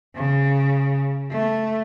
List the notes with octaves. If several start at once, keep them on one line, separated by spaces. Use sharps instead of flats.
C#3
A3